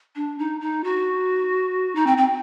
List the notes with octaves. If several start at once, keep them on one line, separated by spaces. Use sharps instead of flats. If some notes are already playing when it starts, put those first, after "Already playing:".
D4
D#4
D#4
F#4
D#4
C4
C4